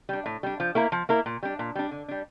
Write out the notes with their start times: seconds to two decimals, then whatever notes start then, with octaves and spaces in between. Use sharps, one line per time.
0.09 G3 D4
0.26 A2
0.43 G3 D4
0.60 F3
0.75 A#3 E4 A#4
0.92 F3
1.09 A#3 E4 A#4
1.26 A#2
1.43 G3 D4
1.59 A#2
1.75 G3 D4
1.91 D3
2.08 G3 D4